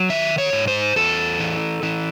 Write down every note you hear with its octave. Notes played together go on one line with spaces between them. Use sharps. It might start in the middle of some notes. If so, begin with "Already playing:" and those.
Already playing: F#3
D#3 E5
C#5
G#2
C5
E2 A4
E3
E3